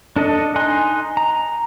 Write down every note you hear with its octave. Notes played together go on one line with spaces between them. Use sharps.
D4 A4 D#5
D#4 D#5 G#5 C6 F#6
A#5